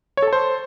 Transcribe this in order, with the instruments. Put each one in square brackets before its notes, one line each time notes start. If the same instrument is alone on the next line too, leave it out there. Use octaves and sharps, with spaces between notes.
[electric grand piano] C#5
A4
A5
C5